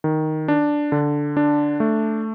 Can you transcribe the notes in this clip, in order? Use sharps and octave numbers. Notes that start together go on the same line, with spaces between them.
D#3
D4
D3
D4
A3